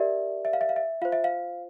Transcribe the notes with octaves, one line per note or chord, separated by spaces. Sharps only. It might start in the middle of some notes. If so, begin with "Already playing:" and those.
Already playing: G4 A#4 D5 E5
E5
F5
E5
F5
E5
F4 C5 F5
E5
F5